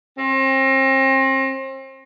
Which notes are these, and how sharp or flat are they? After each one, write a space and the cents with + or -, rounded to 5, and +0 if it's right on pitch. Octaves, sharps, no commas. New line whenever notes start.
C4 +35